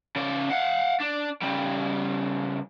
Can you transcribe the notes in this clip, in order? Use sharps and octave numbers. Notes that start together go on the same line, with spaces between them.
C#3 D5
F5 F#5
D4
C#3 G3